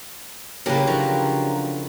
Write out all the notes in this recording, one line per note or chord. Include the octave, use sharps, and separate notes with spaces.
F#1 C#3 F#3 A#3 E4 G4 A#4 B4
D3 F3 F#4